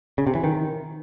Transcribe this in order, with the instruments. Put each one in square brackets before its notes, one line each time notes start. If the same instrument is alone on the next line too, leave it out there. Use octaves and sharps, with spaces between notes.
[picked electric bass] C#3
C3
E3
D#3